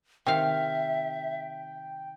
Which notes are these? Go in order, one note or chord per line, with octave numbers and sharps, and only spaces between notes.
C3 D#3 E5 F5 G5